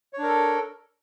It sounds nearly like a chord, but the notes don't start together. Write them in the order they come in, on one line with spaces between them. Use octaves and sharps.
C#5 D4 A#4 A4